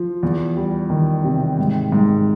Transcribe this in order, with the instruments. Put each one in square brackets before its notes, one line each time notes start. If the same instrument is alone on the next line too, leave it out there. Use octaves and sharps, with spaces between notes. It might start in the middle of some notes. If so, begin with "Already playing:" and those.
Already playing: [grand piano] F3
E2
G3
D#3
C3
G#2
G#2